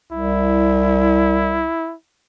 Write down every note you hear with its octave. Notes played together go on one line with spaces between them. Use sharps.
C2 E4